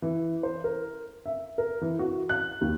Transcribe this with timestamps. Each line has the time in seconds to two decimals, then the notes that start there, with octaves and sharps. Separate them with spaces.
0.02 E3
0.43 C5
0.64 A#4
1.26 E5
1.58 A#4
1.81 E3
1.99 F#4
2.29 F#6
2.61 D#2